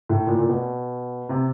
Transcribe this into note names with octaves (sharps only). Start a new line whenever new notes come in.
A2
A#2
A#2
B2
C3